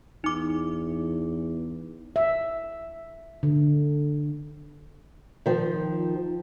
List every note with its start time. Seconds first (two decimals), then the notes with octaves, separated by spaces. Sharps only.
0.24 E2 D#4 D6
2.16 E5
3.43 D3
5.46 D#3 F3